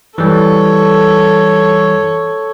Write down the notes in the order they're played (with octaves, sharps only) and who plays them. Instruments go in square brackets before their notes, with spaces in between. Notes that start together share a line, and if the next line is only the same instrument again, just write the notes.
[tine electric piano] E3 G3 [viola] A4 C#5